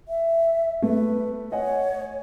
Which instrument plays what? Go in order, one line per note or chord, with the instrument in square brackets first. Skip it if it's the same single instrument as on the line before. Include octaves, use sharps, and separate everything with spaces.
[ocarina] E5
[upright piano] A3 [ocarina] B4
[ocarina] C#5 [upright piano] D#5 F#5 G#5